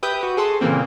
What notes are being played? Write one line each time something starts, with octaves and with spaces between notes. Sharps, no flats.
G4 B4 E5 D#6 G6
F#4 B4
G#4 A4 C6
A#2 C#3 E3 A#3 C4